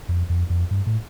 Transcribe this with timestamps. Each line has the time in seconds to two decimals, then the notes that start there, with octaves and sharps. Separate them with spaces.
0.09 F2
0.29 F2
0.50 F2
0.71 G2
0.86 A2